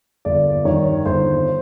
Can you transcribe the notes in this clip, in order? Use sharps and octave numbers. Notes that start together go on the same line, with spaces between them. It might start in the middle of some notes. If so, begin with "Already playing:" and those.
G1 D5
G2 D#3 C#5
G1 C5